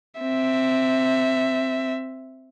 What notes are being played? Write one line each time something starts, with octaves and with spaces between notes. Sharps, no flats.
C4 E5